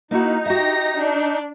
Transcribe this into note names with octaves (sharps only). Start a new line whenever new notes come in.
A#3 D#4 E4 F#4
F#4 G4 E5 A#6
D4